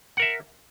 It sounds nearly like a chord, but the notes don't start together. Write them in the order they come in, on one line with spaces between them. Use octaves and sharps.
F#5 A#4 E5